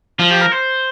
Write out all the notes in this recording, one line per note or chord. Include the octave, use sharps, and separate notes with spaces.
F3 F4
G4
A#4
C5